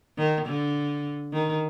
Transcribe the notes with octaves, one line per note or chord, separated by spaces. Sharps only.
D#3
D3
D#3